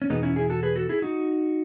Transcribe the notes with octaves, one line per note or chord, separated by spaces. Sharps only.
C#4
E2 B2 G#3 B3 D#4
C#4 E4
E4 G#4
F#4 A4
G#4 B4
F#4 A4
E4 G#4
D#4 F#4